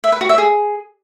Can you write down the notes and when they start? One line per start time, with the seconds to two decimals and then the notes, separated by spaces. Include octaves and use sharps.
0.04 E5
0.12 B4
0.21 F#4
0.29 E5
0.38 G#4